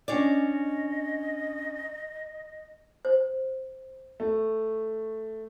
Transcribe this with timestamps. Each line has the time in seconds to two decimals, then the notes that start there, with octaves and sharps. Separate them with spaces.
0.08 C#4 D4 D5 D#5
3.05 C5
4.20 A3